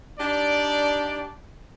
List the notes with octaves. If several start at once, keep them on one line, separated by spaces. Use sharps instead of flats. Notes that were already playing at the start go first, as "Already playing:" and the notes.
D4 D#4 G4 D5